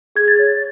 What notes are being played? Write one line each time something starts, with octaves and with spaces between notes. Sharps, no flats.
G#4 G#6
A6
C#5